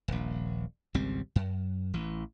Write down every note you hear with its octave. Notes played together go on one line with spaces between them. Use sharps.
D#1 A#1
G#1 C#2 G3 C4
F#2
A1 E3